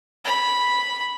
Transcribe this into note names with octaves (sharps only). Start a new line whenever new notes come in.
B5